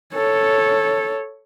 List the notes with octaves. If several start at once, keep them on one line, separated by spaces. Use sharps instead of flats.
A4 C#5